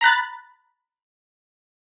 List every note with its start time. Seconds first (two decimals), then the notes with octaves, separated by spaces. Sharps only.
0.01 A#5 B5 F#6 A6